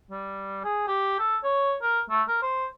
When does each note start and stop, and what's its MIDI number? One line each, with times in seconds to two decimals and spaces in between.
0.11 0.63 55
0.64 0.86 68
0.87 1.17 67
1.19 1.37 69
1.44 1.76 73
1.82 2.00 70
2.10 2.23 57
2.28 2.40 70
2.42 2.67 72